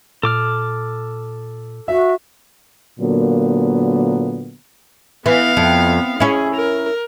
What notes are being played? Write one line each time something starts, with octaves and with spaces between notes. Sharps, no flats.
A#2 A4 D6 F6
F#4 E5
A#2 D3 F#3 A#3 B3
E3 B3 F5
F2
C#4 E4 G#4
A#4